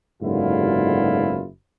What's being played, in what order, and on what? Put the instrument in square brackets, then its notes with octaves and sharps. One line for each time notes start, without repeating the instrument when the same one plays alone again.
[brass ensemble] F#1 G#2 B2 D3 E4 F4